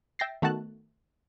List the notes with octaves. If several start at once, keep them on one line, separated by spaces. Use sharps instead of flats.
E5 G5 A6 A#6 C7
D#3 A3 B3 F#4 A5 F#6